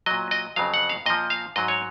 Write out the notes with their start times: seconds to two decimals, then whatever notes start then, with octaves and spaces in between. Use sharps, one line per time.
0.06 A#2 F#3 D#5
0.31 D#5
0.56 F2 C#3 F#3 F5
0.74 F#5
0.90 F5
1.06 A#2 F3 D#5
1.30 F5
1.56 G#2 F#3 D#5
1.68 C#5